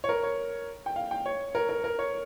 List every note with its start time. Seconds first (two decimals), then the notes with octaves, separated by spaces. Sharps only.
0.04 C#5
0.09 A#4
0.23 C#5
0.86 G5
0.96 F5
1.11 G5
1.26 C#5
1.55 A#4
1.69 A#4
1.84 A#4
1.99 C#5